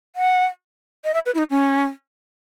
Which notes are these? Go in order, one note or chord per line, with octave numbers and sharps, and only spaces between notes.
F#5
D#5
E5
B4
E4
D#4
C#4